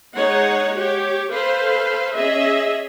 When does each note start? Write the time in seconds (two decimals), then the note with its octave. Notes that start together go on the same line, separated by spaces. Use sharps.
0.17 G#3 D#4 C#5 F#5
0.77 G4 C#5
1.32 A4 B4 C5 F5
2.15 C#4 G#4 D#5 E5